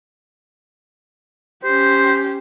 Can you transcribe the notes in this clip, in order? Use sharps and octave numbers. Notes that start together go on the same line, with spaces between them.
C#4 G4 C5